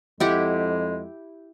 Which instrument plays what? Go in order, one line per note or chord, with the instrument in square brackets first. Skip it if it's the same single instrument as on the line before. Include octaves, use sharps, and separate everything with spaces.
[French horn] F2 [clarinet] G#3 [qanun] E4 G4 F#5